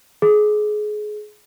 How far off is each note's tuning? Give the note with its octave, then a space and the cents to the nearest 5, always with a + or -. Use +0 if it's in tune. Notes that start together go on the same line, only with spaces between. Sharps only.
G#4 +25